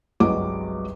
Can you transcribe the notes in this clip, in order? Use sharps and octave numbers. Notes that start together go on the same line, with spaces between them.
G1 C2 F#3 G#3 D#5 D6